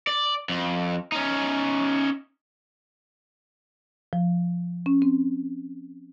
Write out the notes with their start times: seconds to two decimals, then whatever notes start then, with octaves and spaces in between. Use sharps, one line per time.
0.07 D5
0.49 F2
1.12 C#4 D#4
4.13 F3
4.86 C#4
5.02 C4